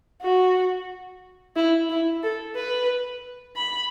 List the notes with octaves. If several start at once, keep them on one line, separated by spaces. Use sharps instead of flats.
F#4
E4
E4
A4
B4
B5